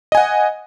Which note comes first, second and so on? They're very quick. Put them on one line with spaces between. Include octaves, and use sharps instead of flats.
D#5 G#5 F#5